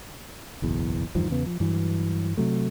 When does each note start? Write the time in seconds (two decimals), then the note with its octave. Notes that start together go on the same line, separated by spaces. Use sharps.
0.62 F#1 B1 E2
1.15 E2 G2 D#3 F3
1.30 E2 C#3 B3
1.46 F3
1.60 G2 E3 F#3
2.37 C3 F#3 A3